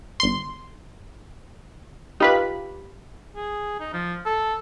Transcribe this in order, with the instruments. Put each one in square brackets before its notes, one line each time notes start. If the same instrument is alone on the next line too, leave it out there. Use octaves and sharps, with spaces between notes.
[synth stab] G1 C6
[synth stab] D#4 F4 B4 [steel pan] G4 B5
[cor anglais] G#4
D#4
F3
A4